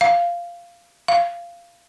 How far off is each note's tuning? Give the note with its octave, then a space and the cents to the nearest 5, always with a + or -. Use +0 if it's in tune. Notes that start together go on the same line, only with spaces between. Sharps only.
F5 -10
F5 -15